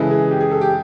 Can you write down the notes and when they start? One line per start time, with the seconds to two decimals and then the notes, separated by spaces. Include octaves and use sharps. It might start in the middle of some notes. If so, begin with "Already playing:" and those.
Already playing: C#3 E3 G#3 A4
0.11 G#4
0.31 G4
0.41 G#4
0.51 A4
0.61 G4